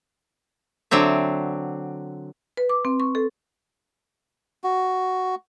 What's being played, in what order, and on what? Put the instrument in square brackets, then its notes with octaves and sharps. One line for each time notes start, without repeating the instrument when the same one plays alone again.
[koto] D3 F#3 C4 E5
[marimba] B4
D6
C4
C#6
A4
[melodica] F#4